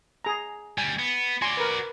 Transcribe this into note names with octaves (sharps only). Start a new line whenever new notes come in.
G#4 A#5
D2 G3 G#5
B3
F#4 D5 G#5 C6
A#4 B4